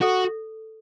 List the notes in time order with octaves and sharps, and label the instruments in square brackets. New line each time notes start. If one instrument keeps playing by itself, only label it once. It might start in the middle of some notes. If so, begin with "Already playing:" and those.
[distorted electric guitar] F#4 [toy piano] A4